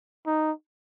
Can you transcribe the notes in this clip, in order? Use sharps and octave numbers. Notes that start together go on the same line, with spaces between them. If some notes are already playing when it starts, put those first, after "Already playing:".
D#4